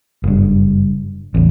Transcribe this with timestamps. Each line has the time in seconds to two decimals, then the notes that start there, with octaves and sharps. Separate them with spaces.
0.23 F#1 G2
1.34 A1 E2